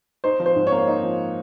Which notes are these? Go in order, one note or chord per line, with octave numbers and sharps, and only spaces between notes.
D#4 C5
F3
C5
G#2
A#3 C#5
D#4
F3